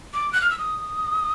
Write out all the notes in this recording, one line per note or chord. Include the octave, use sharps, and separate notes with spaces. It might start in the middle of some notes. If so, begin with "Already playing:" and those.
D6
F#6
F6
E6
D#6